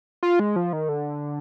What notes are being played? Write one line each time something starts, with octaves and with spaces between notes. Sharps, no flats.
F4
G#3
F3
D#3
D3